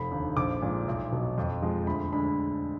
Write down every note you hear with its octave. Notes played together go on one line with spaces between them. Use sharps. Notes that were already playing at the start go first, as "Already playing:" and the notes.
Already playing: F1 B5
D#2 D3
A#1 D6
A#2 F3 G#3
B1
B2 F#3
F2
F3 G#3
D2 B5
D3 G#3 B5